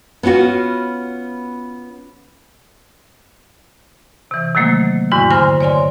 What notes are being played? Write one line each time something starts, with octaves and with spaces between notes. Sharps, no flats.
B3 C#4 F4 F#4
C3 E3
C3 D#3 F#3 A3 A#3
E2 G#2 D3 E4 F#4 C#6
G2 D3 C5 G#5 C6 F6
C#5 D5 G#5 C6